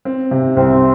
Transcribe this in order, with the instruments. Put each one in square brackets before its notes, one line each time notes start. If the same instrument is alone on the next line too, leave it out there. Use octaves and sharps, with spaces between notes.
[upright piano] C4
C3
[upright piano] C2 [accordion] C4